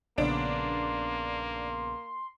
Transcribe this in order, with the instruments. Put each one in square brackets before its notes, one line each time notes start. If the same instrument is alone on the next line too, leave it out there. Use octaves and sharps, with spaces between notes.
[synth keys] A#1 C#3 B3 [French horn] A#3 [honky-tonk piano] D4 D7 [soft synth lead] C6